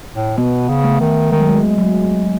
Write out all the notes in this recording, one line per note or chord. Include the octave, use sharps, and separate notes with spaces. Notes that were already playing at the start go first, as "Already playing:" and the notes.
A2
B2 B3
C#3
A3
D#3
D#3 G#3
F#3
G#3
F#3